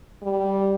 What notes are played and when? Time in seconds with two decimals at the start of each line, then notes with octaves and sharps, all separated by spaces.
0.23 G3